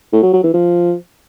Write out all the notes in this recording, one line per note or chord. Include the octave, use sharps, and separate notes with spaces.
A2
F#3
F#3
E3
F3